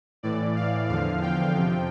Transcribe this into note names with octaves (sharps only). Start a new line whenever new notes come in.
A2 E3 D5
F5
E2 D3 F3 F5
G5
F2 C3 F3